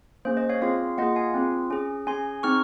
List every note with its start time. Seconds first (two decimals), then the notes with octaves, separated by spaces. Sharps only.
0.25 A#3 C#4 G#4 C5
0.37 C5 D#5
0.49 C#5 F5
0.62 C4 F4 G#4 C#5 F5
0.98 A#3 F4 G#4 D#5 F#5
1.16 F5 G#5
1.34 C4 F4 G#4
1.70 C#4 G#4
2.07 C#4 G#4 G#5 C6
2.43 C4 D#4 G#4 C#6 F6